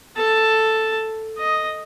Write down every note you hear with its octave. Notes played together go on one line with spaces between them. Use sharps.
A4 A5
D#5